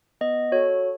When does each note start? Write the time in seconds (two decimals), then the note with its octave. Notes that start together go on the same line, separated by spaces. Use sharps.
0.21 B3 D#5
0.52 F#4 A4 C#5